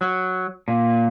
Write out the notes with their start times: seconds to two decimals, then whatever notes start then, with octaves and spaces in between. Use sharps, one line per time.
0.01 F#3
0.68 A#2